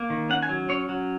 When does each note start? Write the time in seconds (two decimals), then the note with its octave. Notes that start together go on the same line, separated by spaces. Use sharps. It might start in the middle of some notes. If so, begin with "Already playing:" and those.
Already playing: A#3
0.10 D#3
0.29 C#4 F#5
0.43 G#5
0.49 F#3
0.69 C#4 C#5
0.89 F#3